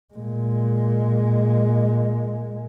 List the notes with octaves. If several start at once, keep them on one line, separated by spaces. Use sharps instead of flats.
A#2 G#3